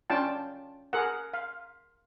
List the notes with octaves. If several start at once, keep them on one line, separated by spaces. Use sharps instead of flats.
C#4 D4 F4 G5 A5
G#4 A#4 F#5
F5